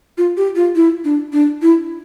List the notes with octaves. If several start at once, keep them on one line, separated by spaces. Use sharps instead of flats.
F4
G4
F4
E4
D4
D4
E4